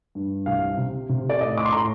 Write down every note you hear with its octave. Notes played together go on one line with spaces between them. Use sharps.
G2
C2 F5
C3
C3
D5
A2 D#5
D6
C6
A2 A#5